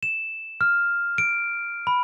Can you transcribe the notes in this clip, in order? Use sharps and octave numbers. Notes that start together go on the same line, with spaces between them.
E7
F6
D7
B5